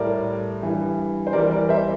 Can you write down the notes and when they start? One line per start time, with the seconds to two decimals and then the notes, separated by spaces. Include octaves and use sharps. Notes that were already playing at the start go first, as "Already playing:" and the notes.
Already playing: A2 G3 A#4 D5
0.62 G2 E3 G3
1.27 C5
1.33 E2 E3 G3 A#4 D5
1.51 A#4 D5
1.69 C5 E5